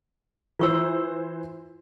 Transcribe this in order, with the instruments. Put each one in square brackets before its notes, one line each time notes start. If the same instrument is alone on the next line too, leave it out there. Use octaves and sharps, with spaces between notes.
[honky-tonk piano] E3 E4 C5 [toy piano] F4 C#6 E6